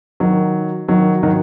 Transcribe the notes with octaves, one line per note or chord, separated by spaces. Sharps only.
D#3 F#3
D#3 F#3
D#3 F#3